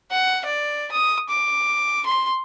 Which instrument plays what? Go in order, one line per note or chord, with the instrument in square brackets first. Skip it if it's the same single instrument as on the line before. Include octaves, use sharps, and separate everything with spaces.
[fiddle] F#5
D5
D#6
D6
C6